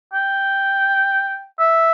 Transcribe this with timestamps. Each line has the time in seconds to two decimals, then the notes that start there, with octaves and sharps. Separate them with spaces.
0.13 G5
1.60 E5